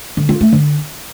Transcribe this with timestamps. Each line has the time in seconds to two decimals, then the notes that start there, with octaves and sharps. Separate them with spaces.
0.17 D3
0.29 F4
0.41 A3
0.53 D3